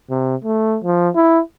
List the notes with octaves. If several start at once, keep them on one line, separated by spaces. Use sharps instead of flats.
C3
A3
F3
E4